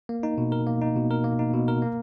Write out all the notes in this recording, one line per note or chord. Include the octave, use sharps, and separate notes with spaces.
A#3
D#4
B2
A#4
A#3
D#4
B2
A#4
A#3
D#4
B2
A#4
A#3